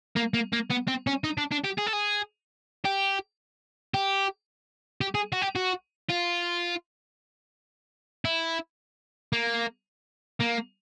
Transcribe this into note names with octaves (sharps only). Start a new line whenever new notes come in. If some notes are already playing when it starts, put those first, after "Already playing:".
A#3
A#3
A#3
B3
C4
C#4
D#4
D4
D4
G4
G#4
A4
G#4
G4
G4
G4
G#4
F#4
G4
F#4
F4
E4
A#3
A#3